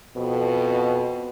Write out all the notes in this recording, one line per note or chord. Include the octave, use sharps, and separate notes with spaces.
F2 B2